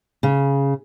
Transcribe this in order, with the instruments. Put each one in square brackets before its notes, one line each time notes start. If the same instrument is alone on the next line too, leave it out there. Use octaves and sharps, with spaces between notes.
[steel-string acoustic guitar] C#3